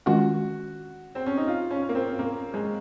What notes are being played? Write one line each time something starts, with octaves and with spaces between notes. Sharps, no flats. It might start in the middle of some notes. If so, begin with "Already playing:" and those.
D#3 G#3 C#4 F4 F#4
C4
C#4
D#4
F4
C#4
A#3
C4
A#3
G#3